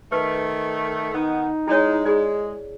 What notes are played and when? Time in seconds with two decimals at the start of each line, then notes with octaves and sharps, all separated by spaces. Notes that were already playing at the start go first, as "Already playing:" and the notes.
0.12 D#3 A3 B4
1.13 D#3 B3 D#4
1.68 G#3 E4 C#5
2.06 G#3 G#4 D5